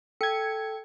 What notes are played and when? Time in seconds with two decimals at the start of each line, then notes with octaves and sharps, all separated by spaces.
0.21 A4 G5 G#6 C#7